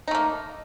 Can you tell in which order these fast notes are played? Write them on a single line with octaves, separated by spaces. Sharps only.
D#4 A3 A#3